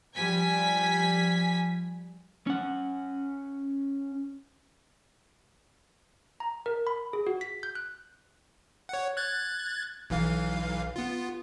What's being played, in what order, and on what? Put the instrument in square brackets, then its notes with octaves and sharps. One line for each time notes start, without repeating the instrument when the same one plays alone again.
[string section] F3 G3 G#5 G#6 B6
[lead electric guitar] C#4 F#5
[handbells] A#5
A#4
B5
G#4
F#4
B6
G6
F#6
[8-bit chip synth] C#5 F#5
F#6 G#6 A6
B1 E3 F5
B3 F4